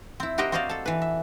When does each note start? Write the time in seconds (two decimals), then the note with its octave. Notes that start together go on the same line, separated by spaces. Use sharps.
0.20 C4 E4
0.38 F#4 G4 A#4 C5 D#5 G5
0.52 C4 F#4 C5 D5 D#5 F5
0.69 A4 A5
0.86 E3 B4
1.02 E5